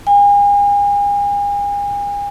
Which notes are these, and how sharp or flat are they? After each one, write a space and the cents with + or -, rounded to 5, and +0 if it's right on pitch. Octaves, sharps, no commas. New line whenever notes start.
G#5 -40